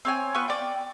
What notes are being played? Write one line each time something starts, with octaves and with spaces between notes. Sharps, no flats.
C4 C#5 G#5
B3 F4 C#6 E6
D5 G5